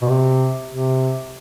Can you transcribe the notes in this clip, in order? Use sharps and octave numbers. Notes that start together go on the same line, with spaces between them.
B2
C3
C3